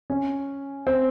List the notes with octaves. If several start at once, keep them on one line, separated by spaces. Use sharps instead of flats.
C#4
C4